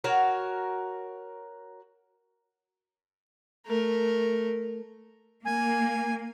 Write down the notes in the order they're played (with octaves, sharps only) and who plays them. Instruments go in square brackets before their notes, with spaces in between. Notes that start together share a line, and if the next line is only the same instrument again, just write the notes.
[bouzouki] F#4 A#4 C#5 F5
[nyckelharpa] A3 A#4
[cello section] A#3 [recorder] G#5